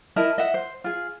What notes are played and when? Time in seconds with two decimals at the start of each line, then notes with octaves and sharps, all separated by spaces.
0.16 E4 A#4 D#5 A5
0.38 D#5 E5 F#5
0.54 C5
0.84 F4 G#4